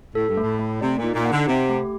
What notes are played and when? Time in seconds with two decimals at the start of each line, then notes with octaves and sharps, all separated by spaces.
0.15 A2 A4
0.28 G2
0.37 A3
0.42 A2
0.59 A3
0.81 C3 D5
0.98 A#2
1.03 D#4
1.14 A#2
1.25 F#5
1.31 D3
1.47 C3 G4
1.69 A3